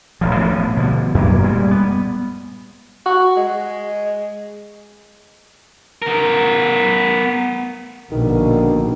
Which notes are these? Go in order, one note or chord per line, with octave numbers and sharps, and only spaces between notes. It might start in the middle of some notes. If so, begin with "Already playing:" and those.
D#1 A1 F3
A2 F3 G#3 B3
B2 D3 F3
F#2 B2 F#3 A#3
A#2 G3 G#3
B3
F#4
G#3
B3 A#4
A#1 B2 D3 D#3